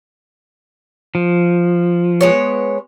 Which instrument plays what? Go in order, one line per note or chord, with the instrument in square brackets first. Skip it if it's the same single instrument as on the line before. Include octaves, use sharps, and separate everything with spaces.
[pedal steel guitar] F3
[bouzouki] G#3 B3 C#5